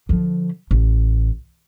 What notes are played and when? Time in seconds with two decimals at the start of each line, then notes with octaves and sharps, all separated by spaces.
0.09 D3 F3
0.71 A1